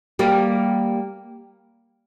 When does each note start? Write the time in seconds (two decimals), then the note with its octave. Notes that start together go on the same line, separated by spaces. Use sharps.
0.19 G3 A#3